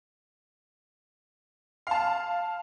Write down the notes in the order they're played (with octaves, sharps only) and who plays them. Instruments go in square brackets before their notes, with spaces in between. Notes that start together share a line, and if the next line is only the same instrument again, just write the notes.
[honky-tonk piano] F5 A5